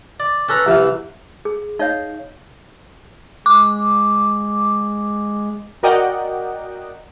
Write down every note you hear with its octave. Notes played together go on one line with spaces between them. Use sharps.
D5
C#4 A4 B4 A#5
C2 E3 F5
G#4
D#4 C#5 D#5 F5
G#3 D6
F#4 A#4 D5 D#5 F#5 G5